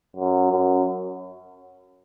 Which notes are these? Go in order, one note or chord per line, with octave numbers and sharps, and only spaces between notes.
F#2
F#2